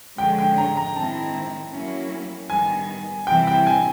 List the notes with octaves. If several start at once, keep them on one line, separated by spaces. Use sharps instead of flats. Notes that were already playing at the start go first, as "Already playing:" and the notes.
D3 F3 G#3 C#4 G5
G5
A#5
A#5
D#3 G#3 C4 E4 A5
F#3 A#3 C#4 E4
D#3 G3 B3 G#5
C3 E3 G3 C4 E4 G5
G5
G#5